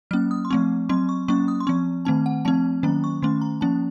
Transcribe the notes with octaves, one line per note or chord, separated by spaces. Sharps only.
F#3 A#3 C#4 F6
D#6
C6
F3 A3 C4 C#6
F#3 C4 C6
C#6
F#3 A#3 C#4 C#6
D#6
C6
F3 C4 C#6
D#3 A3 C4 A5
F#5
F3 A3 C4 A5
D#3 F#3 A#3 C#4 A#5
C#6
D#3 A3 C#4 C6
A#5
F3 A#3 C#4 A5